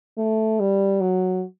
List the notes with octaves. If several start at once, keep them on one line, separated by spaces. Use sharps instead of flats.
A3
G3
F#3